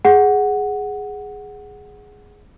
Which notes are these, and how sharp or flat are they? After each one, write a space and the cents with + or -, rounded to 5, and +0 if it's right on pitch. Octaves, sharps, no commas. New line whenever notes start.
G#4 +0 F#5 +0